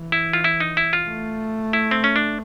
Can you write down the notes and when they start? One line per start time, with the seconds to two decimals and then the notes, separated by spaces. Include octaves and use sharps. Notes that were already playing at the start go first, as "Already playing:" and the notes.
Already playing: E3
0.12 E4
0.33 F4
0.44 E4
0.60 D#4
0.77 E4
0.93 F4
1.08 A3
1.73 E4
1.91 C4
2.04 C#4
2.16 D4